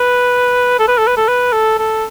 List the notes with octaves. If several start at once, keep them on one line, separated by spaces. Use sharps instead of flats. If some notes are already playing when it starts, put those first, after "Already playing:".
Already playing: B4
A4
B4
A4
B4
A4
B4
A4
A4